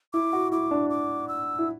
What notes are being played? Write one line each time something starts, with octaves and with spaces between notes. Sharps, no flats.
E4 D6
F#4
E4 D6
D4
D6
E6
E4